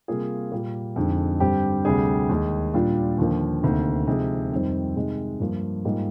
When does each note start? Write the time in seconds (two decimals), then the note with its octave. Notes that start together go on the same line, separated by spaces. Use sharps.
0.08 C3 G3 A#3 F4 G#4
0.52 A#2 G3 A#3
0.96 F2 D3 G#3 D#4
1.40 G2 D3 G3 C4 G4
1.85 D2 C3 G3 D4 G#4
2.29 D#2 D#3 G#3 D#4 G#4
2.74 A#2 G3 D4 F4
3.18 D#2 D3 F3 A#3
3.63 D2 C3 D#3 A#3
4.07 C3 F3 G#3 D#4 G#4
4.52 F2 D#3 G3 C4
4.96 C3 D#3 G#3
5.40 G2 F3 A#3
5.85 G#2 G3 A#3 F4 G#4